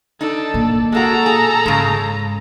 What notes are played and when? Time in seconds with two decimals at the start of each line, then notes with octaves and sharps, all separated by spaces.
0.21 D4 D#4 A4
0.54 A#2
0.92 G#3 A#3 F#4 A4 A#5
1.26 G#4
1.66 G#2 C#3 G#3